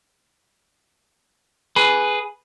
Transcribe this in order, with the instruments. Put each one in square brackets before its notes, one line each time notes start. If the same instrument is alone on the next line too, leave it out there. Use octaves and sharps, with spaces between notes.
[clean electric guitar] G#4 B4